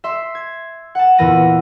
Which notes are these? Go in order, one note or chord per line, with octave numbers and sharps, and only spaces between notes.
E5 C6
G#6
F#5 A5
E2 A#2 E3 B3 A#6 D#7